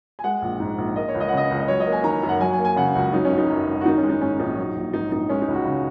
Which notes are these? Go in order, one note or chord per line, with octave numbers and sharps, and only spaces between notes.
G#5
G#3 F#5
A#1
G#2
A#1
A#3 D#5
C#5
C#2
D#5
F#5
C#3 D#5
C#2
D#5
F#3 C#5
D#5
A#3
G#5
D#3 A#5
F#2
F#5
F#3 G#5
G#5
A#3
G#5
C#3 F#5
C#2 F#4
F#3 D#4
C#4
G#1
D#4
F#2
G#1
F#4
D#3 D#4
C#4
G#3
D#4
G#2 C#4
A#1 D#4
F#3
A#1
G#2 D#4
A#1 D#4
G#3 C#4
D#4
C#2
F#4
C#3